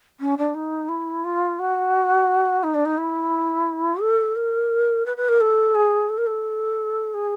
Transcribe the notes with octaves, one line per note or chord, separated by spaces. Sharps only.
C#4
D4
D#4
E4
F4
F#4
D#4
D4
D#4
E4
A4
A#4
B4
B4
A#4
A4
G#4
A4
A#4
A4
G#4